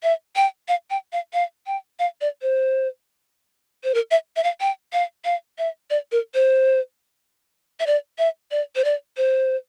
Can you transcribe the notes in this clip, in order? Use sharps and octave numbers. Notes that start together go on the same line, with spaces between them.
E5
G5
F5
G5
F5
F5
G5
F5
D5
C5
C5
A#4
E5
E5
F5
G5
F5
F5
E5
D5
A#4
C5
E5
D5
E5
D5
C5
D5
C5